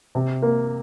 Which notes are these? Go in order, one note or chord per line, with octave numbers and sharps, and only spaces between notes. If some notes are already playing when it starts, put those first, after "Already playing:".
C3
A#3